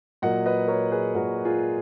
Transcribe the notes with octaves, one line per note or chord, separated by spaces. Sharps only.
A#2 F#3 A#3 D#5 F#5
B4 D#5
A#4 C#5
G#4 B4
A#2 F#3 A#3 F#4 A#4
F4 G#4